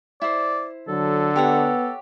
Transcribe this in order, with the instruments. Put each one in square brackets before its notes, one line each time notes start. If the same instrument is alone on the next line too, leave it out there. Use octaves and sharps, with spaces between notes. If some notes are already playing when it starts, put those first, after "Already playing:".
[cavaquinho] E4 C5 [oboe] D5
[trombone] D3 [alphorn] F#3 [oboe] A4
[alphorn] B3 [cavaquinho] G4 C#5 F#5